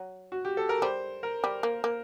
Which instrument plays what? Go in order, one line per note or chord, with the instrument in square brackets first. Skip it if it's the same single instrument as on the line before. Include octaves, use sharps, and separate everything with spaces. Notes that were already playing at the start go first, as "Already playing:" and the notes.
Already playing: [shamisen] F#3
[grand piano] F#4
G4
A4
A#4
[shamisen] G3 [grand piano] C5
[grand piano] A#4
[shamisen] G3
A#3
A#3